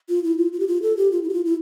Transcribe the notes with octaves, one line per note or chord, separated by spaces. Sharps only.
F4
E4
F4
F4
G4
F4
A4
G4
F4
E4
G4
F4
E4